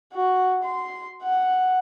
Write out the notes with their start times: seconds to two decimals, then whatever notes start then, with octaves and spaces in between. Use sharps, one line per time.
0.14 F#4
0.63 C6
1.23 F#5